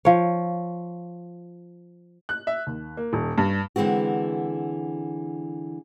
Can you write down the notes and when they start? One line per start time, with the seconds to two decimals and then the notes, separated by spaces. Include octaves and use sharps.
0.05 F3 C#5
2.29 F#6
2.47 E5
2.67 D#2
2.97 A#3
3.13 D#1
3.38 G2
3.76 D3 E3 G#3 C4 F#4